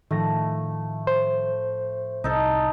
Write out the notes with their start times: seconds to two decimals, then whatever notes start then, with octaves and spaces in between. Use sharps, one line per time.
0.11 A2 D#3 F3 A3 A#6
1.07 C5
2.24 C2 D#4 A4